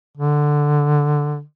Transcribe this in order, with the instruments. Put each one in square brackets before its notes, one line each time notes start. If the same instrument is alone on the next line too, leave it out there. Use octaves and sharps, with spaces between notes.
[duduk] D3